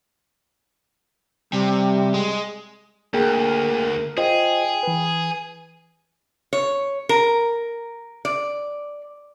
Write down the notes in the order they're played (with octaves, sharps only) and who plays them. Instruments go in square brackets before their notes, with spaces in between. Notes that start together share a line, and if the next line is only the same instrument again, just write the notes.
[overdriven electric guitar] C3 [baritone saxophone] G3
[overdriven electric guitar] G#3
[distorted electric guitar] D2 [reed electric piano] A#3 G#4 G5 [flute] A#4
[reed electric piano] F4 C5 D#5 [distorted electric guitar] G#4 [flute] G5
[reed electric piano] E3 B4
[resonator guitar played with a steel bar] C#5
A#4
D5